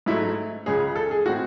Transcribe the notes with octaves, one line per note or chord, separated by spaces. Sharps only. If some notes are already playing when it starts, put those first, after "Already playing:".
G#2 F#3 A3 E4
C#2 C#3 G#3 C#4 G#4
A4
G#4
A2 G#3 C4 F#4